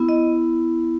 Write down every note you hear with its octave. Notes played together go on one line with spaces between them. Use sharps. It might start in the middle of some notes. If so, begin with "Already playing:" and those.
Already playing: B3 E4
D#5